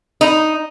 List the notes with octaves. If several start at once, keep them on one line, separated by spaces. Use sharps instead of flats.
D#4